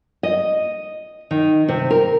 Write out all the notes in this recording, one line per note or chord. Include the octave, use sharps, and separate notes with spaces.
D#5
D#3
C3
A#4